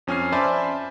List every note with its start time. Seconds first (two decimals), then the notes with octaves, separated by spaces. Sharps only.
0.07 F2 C#4 G#5 F6 C7
0.32 C5 D5 E5 G#5 A5 B5